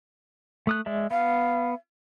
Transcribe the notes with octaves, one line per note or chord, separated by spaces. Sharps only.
A3 D#6 F#6
G#3 D5 E5
B3 F5